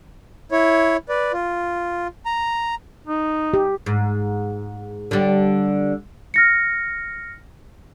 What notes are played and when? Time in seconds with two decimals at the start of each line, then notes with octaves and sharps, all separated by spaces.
0.52 E4 C#5
1.09 B4 D5
1.33 F4
2.26 A#5
3.07 D#4
3.54 G4
3.86 G#2
5.11 D3 G3
6.34 F6 A#6 C#7